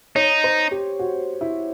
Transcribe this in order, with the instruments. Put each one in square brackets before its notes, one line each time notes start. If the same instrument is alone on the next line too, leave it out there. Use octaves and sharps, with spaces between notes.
[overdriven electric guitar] D#4 [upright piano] C#5
[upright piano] C5
G4
F#4
E4